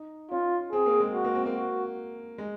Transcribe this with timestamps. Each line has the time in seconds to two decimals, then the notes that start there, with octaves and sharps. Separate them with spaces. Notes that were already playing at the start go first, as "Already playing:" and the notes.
Already playing: D#4
0.31 C#4 F4
0.72 C4 G#4
0.86 A#3
1.00 G#3
1.14 F#4
1.24 A#3
1.35 C4
1.46 A#3
1.56 F#4
2.38 G#3